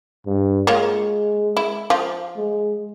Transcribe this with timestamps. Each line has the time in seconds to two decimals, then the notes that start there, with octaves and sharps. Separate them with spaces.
0.26 G2
0.67 G#3 A#3 F4 C#5
1.57 E4
1.90 F3 F4
2.37 G#3